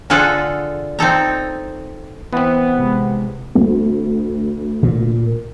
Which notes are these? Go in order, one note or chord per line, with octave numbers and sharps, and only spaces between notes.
D3 F4 G#4 A4 F#5
C4 D#4 A4 A#5
E3 B3 C4
C3 G#3
D2
A#2